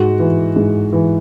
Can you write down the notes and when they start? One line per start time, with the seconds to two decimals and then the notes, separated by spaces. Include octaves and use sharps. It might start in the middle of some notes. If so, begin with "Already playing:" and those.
Already playing: G#2 F#4
0.19 E3
0.56 G#2
0.93 E3